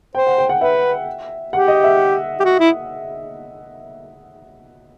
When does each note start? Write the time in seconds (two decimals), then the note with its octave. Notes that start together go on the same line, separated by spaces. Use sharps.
0.15 C5 G5
0.27 F#5
0.38 G5
0.49 F#5
0.61 B4 E5
1.53 G4 F#5
1.68 D#5
1.84 E5
2.40 G4
2.44 F#4
2.60 E4